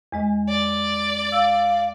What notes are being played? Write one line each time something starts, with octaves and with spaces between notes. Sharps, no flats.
E2 G#3 D#5
D5
F5 E6